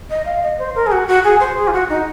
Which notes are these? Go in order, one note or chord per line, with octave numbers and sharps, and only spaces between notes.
D#5
F5
D#5
C5
A#4
G#4
F#4
F#4
G#4
C5
G#4
F4
F#4
D#4